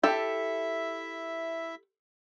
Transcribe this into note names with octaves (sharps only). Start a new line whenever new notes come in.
E4 G4 A4 E5